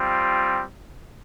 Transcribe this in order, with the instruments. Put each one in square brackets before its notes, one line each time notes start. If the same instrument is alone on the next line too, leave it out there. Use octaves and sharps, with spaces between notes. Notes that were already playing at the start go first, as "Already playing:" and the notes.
Already playing: [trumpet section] G3 C4 F4